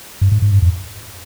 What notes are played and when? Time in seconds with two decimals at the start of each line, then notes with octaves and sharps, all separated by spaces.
0.21 G2
0.32 G#2
0.42 G#2
0.52 G2
0.62 F2